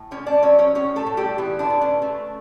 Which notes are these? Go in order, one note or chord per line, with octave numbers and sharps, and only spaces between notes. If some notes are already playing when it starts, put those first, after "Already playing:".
Already playing: A2
D3 C#4 C#5
D4 D5
F#3 C#4 C#5
C#4 C#5
A2 C#4 C#5
A3 A4
A2
G3 G4
E3 B3 E4
D3 D4
B3
C#4
A3